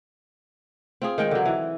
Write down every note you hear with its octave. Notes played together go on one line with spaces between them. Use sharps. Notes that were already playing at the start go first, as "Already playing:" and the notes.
C4 F4 G#4
D#3 G#3 G5
D3 F#3
E3